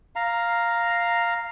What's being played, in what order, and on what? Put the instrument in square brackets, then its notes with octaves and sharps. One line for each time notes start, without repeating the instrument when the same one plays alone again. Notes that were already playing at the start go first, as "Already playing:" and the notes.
[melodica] F5 A#5